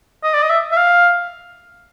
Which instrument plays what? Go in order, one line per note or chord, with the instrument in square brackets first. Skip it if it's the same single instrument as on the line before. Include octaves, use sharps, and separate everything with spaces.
[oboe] D#5
D5
D#5
E5
E5
F5